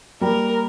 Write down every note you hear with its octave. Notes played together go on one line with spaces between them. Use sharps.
G3 A#3 A#4